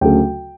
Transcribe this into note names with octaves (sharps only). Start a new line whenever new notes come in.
D2 C#3 F#3 A3 G5